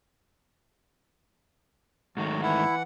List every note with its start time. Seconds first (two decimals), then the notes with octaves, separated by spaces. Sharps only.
2.17 G#2 D#3 F#3 A3 F#4
2.42 E3 E4 F#5